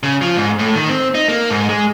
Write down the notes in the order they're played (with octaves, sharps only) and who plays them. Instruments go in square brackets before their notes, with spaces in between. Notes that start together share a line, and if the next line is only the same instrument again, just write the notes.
[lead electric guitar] C#3
F3
G#2
A2
D#3
C4
D#4
A#3
G#2
G#3